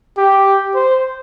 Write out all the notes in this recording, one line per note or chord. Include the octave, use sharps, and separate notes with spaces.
G4
C5